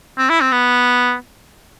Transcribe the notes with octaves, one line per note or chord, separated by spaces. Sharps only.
C4
E4
C4
B3